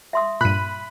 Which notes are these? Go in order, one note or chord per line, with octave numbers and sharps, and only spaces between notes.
E5 C6 D#6
G2 A#2 B5 F#6 D#7